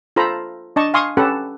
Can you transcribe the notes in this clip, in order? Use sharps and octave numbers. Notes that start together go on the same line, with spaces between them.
F4 A4 C5 A#5 B5
D4 D#5 A5 C#6
F5 G#5 C6 C#6 D#6
C#4 G4 A4 B4 F#5